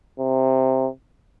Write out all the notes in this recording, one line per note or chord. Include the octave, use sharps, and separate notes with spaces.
C3